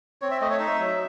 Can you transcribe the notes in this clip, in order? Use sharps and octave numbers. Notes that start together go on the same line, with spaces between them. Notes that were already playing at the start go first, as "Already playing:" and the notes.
C4 C#5
E5
A3 D#5
C#5
D#4 E5
F#3